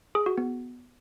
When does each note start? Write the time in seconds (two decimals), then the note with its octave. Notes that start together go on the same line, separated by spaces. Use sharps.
0.15 G#4
0.26 F#4
0.38 B3